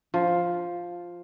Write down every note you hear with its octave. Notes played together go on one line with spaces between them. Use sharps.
F3